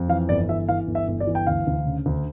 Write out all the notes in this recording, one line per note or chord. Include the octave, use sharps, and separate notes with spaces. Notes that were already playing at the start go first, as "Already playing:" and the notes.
Already playing: F2
E3 F5
G1 D5
E3 E5
E3 F5
G1
E5
G1
D5
E3
G5
D2 F5
D2
C#3
D2